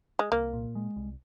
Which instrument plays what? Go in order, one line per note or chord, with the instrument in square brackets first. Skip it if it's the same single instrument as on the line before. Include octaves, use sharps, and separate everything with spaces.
[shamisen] G#3
[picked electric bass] C2 [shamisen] A#3
[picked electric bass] A#2
G#3
C2